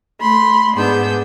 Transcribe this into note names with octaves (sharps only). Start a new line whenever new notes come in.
A3 B5 C6
G#2 B3 D4 G#4 E6 G6